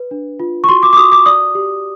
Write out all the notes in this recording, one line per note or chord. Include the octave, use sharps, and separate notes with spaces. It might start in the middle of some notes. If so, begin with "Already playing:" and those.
Already playing: B4
D4
F4
C#6
F#4 C6
D6
D6
F#4 D#6
D6
D5 D#6
G4